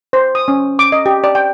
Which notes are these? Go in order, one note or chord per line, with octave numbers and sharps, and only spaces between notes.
C5
D#6
C#4
D6
D#5
G4
D5
G5